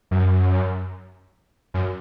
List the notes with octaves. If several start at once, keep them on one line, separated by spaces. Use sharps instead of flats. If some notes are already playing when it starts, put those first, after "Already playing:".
F#2
F#2